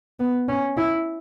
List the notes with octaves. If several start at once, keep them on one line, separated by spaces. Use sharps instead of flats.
B3
C#4
E4